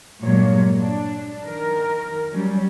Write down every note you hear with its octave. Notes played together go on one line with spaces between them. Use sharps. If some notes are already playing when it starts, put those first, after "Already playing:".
G2 A#2 F#3 G#3 A#3 C#5
D4
D#3 A#4
F#3 G3 C#4